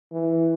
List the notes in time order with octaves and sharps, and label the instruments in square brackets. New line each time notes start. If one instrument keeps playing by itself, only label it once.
[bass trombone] E3